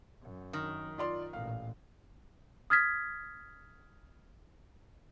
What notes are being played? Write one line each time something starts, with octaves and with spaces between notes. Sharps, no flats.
F#2
D#3
F4 D5 C6
A1 A#2 F5
D#6 F6 G#6 A6 B6